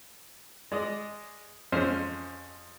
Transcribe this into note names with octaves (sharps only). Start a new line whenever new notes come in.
G#3 D5 D#5
F2 G#3 C#4 C5 F6